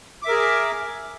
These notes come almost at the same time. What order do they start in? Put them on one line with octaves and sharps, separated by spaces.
D6 E5 A#4 G#4